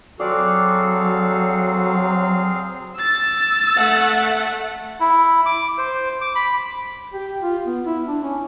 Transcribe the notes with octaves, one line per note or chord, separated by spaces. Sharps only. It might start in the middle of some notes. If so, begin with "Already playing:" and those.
F#3 C4 F#4 G#4 A4 D5 F5
E6 A6
A3 F#5
E4
D6
C5
D6
B5
G4
F4
B3
E4
D4
C#4